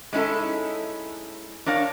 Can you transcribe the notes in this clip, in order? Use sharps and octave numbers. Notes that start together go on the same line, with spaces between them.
G#3 C#4 D#4 E4 A4
D4 A#4 C#5 F5